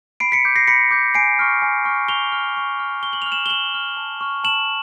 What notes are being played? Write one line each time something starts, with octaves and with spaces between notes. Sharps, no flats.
B5 C7 D7
B6 C#7
D6 G6
A#6 C7
B5 B6 C#7
D6 G6
G#5 C7 D7
C#6 F6
G#5
C#6 F6
C#6 F7 G7
F6
C#6
F6
C#6 G7
F#7
F6 F7
E7 F#7
G7
C#6 E7 F#7
F6
A5
C#6 F6
A5 E7 F#7